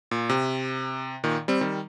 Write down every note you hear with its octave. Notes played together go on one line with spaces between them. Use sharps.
A#2
C3
A#2 D#3
G3 C4
D#3 G3